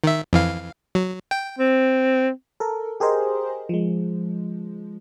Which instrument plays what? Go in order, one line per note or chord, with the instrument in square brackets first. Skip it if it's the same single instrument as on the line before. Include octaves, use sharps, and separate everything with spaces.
[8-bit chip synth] D#3 E5
F2 E3 F5
F#3
G5
[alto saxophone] C4
[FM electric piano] A4 A#4
G4 G#4 A#4 C5 D#5
F3 G#3